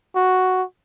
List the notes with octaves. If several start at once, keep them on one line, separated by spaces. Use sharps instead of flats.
F#4